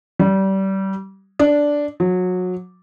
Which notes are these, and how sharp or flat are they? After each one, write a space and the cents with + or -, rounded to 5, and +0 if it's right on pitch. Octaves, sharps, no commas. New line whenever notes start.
G3 -25
D4 -5
F#3 -25